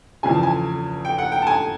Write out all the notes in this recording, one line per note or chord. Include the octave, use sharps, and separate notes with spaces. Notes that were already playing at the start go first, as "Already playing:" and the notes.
E2 C#3 F3 G#5
A5
G#5
G5
F#5
G5
A5
G#5